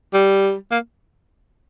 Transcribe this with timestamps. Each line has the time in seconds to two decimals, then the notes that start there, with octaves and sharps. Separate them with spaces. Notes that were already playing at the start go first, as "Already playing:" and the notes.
0.13 G3
0.71 A#3